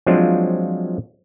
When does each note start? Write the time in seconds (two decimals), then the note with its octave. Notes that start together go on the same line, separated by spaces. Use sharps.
0.07 F3 F#3 G#3 C4 D4 F4